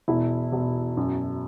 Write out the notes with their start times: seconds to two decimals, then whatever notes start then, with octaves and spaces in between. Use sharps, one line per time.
0.08 E1 E4
0.52 E1
0.97 F#2